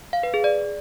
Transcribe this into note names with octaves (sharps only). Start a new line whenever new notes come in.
F5
B4
G#4
D5